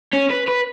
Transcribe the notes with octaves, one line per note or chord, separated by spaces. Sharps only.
C#4
B4
B4